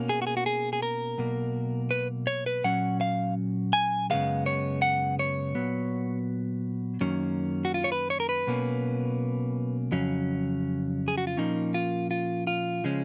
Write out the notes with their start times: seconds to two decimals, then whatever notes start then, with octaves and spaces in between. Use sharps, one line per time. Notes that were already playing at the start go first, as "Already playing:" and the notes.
Already playing: B2 A#3 C#4
0.09 G#4
0.22 F#4
0.27 G#4
0.37 F#4
0.46 G#4
0.73 G#4
0.82 A#4
1.18 B1 B2 A#3
1.91 B4
2.27 C#5
2.46 B4
2.64 A#2 F#3 C#4 F#5
3.01 F5
3.73 G#5
4.10 F#2 C#3 F3 G#3 B3 F5
4.46 C#5
4.82 F#5
5.19 C#5
5.55 A#2 F#3 B3
7.01 F#2 D#3 F#3 A#3 C#4
7.65 F#4
7.74 F4
7.84 C#5
7.92 B4
8.10 C#5
8.20 A#4
8.29 B4
8.47 B1 B2 A#3 C#4
9.91 F2 C#3 F#3 C#4
11.08 G#4
11.18 F#4
11.27 F4
11.37 A#2 F3 A#3 C#4 D#4
11.74 F4
12.11 F4
12.47 F4
12.84 C#3 F3 G#3 C#4